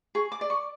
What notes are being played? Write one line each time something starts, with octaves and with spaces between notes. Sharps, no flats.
G#4 C#6
D6
D5
C#6